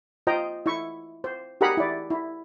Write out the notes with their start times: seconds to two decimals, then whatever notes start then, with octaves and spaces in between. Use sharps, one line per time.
0.27 F4 C5 D#5 G5 A#5
0.66 E4 E5 C#6
1.24 C5
1.61 G4 G#4 A#4 F#5 A#5 B5
1.77 E4 D5
2.10 E4